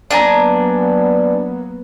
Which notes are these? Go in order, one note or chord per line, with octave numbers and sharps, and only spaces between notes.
F#3 A#3 B3 D4 G#5 A#5